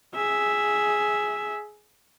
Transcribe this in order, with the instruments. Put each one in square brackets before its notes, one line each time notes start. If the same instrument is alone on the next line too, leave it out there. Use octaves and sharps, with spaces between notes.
[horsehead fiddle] G#4 E5